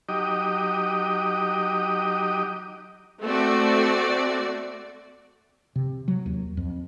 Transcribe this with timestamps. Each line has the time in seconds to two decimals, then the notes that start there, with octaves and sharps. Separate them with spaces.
0.09 F#3 D#4 G4 D#5 D6
3.23 A3 C4 F#4 D5
5.76 C3
6.08 F#3
6.26 D#2
6.57 F2